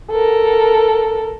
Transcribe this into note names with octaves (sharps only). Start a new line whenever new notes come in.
A4 A#4